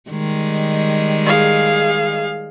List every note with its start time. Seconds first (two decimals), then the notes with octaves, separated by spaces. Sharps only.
0.10 D#3 G3 G#3
1.26 G#4 F5